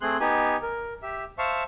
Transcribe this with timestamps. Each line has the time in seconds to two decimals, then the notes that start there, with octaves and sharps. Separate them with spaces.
0.01 A3 C4 G#4 C6 F#6
0.20 B3 D#4 G4 G#5
0.62 A#4
1.02 G4 E5
1.38 C5 E5 F5 A5 C#6